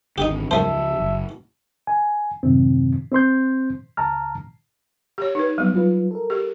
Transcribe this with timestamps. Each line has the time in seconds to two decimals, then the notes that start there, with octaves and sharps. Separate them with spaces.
0.18 G#1 D3 D#4 G4
0.51 C#2 F#2 F3 A3 C5 E5 A5
1.00 F#1
1.87 G#5
2.43 F#2 A2 C3 D#3 C4
3.12 C4 C5 C6 G6
3.97 C#2 A5 A#5 F6
5.18 G4 C#5
5.35 D#4 B4
5.58 F#3 G3 B3
5.74 F#3 F4 B4
6.11 A4 A#4
6.30 G4